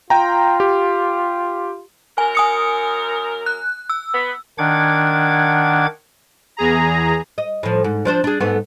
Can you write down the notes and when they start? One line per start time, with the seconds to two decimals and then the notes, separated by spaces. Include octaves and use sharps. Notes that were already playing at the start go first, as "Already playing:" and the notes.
0.10 F4 G5 A#5
0.60 G4
2.18 F#2 A#4 G#5
2.35 G#5 D#6 C#7
3.46 F#6
3.90 E6
4.13 B3
4.58 D#3 D4 F#5 D6 G#6
6.57 E2 G#4 A#5
7.38 D#5
7.63 A2 F3
7.84 G#2
8.05 F3 D4 C5
8.24 D4 G#4
8.40 G#2 A3 B3